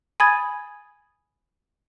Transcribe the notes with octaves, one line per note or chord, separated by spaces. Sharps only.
G#5 B5 D#6 G#6 A6